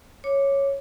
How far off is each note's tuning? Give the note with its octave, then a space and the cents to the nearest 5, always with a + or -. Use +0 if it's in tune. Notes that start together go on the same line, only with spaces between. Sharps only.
C#5 -5 D6 +0